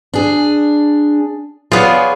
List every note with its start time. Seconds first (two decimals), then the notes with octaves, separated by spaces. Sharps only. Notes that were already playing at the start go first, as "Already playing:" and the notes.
0.13 D4 G#4
1.72 B3 F4 G#4 C#5 D5